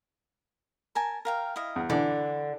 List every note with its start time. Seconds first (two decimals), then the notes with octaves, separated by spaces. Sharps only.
0.95 A#4 G#5 A5
1.25 A#4 F5 G5
1.56 E4 D#5 F5
1.76 E2
1.90 D3 E3 D4 B5